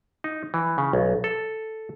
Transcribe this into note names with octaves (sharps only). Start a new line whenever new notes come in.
D#4
E3
C#3
B1
A4